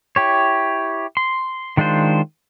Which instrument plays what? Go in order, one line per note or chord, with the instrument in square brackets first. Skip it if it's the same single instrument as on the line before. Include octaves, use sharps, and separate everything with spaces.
[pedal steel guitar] E4 G4 C#5
C6
D#3 G#3 D4 F4 C5